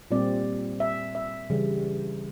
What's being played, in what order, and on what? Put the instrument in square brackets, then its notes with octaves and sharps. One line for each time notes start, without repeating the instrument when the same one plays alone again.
[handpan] A#2 G3 C4 D5
E5
E5
C#3 E3 G3